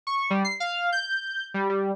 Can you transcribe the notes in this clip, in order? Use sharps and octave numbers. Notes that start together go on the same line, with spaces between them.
C#6
G3
C7
F5
G6
G3
G3